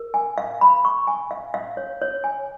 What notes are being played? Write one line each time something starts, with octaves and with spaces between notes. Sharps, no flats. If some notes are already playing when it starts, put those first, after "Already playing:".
Already playing: A#4
G#5
F5
B5
C#6
G#5
F5
F5
C#5
C#5
G#5